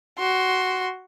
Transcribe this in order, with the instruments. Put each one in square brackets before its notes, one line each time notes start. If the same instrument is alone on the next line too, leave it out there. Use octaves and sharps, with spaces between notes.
[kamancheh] F#4 C6